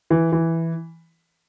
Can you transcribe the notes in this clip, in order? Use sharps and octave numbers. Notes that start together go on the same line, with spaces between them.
E3
E3